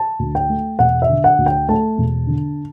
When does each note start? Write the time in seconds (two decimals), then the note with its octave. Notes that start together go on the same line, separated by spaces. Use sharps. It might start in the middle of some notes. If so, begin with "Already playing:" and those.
Already playing: A5
0.19 D2
0.35 G5
0.50 A3
0.79 E1 F#5
1.02 E5
1.09 D3
1.24 F#5
1.38 D2
1.46 G5
1.69 A3 A5
1.98 E1
2.27 D3